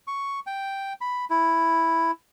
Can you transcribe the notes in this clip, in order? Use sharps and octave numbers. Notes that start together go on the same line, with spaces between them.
C#6
G5
B5
E4